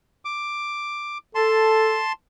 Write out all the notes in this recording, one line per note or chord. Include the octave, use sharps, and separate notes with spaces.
D6
A4 A5 C6